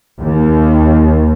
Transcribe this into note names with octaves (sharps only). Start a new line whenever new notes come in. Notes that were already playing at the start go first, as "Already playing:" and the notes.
D#2